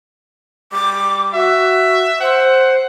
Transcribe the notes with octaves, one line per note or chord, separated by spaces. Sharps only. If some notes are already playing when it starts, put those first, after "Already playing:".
G3 D6
F#4 E5
C5 F#5